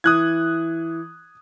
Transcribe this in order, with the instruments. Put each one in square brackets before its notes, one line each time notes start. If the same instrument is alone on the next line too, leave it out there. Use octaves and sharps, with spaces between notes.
[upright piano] E3 [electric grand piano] D#6 F#6 G#6